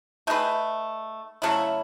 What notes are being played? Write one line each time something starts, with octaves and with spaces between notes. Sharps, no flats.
A3 D#4 G#4 B4
C#3 F#3 A3 E4